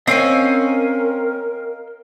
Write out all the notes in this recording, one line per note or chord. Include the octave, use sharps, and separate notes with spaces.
C4 C#4 A#4 D#5 F5 G#5 E6